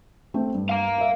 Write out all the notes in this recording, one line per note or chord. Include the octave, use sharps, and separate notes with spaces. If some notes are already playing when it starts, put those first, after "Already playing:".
A3 C4 G5
G2
F5 A#5
A#4 E5